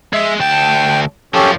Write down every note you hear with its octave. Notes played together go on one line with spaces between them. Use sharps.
G#3 E5
D2 G5 A5
F#2 F3 C#4 G4 A4